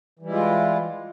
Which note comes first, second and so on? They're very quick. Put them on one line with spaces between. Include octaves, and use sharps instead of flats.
E3 G3 E4 G#3 F4